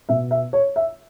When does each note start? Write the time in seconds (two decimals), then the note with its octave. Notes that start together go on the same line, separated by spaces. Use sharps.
0.09 B2 B3 E5
0.31 E5
0.53 C#5
0.76 E5